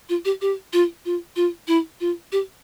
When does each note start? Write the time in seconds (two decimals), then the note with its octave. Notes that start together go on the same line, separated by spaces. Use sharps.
0.09 F4
0.25 G4
0.41 G4
0.73 F4
1.05 F4
1.36 F4
1.68 E4
2.01 F4
2.32 G4